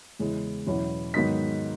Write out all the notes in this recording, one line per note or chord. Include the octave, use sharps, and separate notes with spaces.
E2 C#3 G#3 C#4 E4
E2 B2 F#3 C#4 E4
G#2 D#3 F#3 B3 D#4 B6